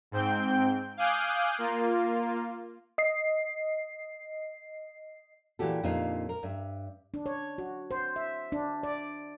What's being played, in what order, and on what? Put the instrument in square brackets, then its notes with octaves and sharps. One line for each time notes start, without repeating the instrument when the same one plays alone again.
[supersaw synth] G#2 C4 G5 G6
F5 G#5 D6 D#6 F#6 G6
A#3 F4
[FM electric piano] D#5 C7
[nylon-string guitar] A#2 E3 F#4 G4 A4
F2 A#2 D4 D#4 F4
A#4
G2 E5
[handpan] D4
C#5
F#4
C5
E5
D4
D5